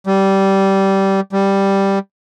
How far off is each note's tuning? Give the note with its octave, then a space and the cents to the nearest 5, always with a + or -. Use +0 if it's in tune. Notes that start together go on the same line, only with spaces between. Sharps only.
G3 -15
G3 +0